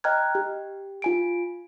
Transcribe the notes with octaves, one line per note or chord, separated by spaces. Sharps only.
D#5 G5 A#5 F6 F#6 G#6
G4
F4 G#5 D7